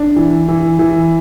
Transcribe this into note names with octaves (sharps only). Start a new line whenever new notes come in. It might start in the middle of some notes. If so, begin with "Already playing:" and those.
Already playing: D4
E3
E3
E3